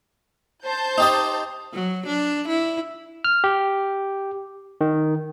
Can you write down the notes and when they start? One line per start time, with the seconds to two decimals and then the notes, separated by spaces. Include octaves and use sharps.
0.64 C5 A5 G6
0.98 D#4 G4 D#5
1.73 F#3
2.06 D4
2.48 E4
3.24 F6
3.44 G4
4.81 D#3